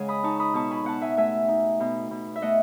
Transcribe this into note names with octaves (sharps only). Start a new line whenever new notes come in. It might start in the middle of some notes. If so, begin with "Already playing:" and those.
Already playing: C#3 G#3 F#5 G#5
B5 D#6
D#4 A5 C#6
B5 D#6
B2 A5 C#6
G#5 B5
B2 F#5 A5
E5 G#5
A3 E5 G#5
D#4
B2
B2
E5
A3 D#5 F#5